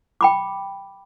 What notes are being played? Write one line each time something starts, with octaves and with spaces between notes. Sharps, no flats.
G5 B5 D6